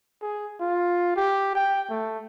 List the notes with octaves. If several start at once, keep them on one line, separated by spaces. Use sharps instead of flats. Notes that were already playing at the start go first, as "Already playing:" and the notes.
G#4
F4
G4
G5
A3